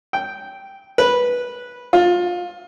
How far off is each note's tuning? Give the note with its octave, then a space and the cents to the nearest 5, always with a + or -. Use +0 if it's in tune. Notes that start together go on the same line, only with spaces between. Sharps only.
G5 -5
B4 -10
F4 +20